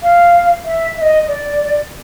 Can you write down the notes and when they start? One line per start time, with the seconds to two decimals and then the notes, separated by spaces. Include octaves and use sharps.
0.03 F5
0.65 E5
0.97 E5
1.02 D#5
1.28 D5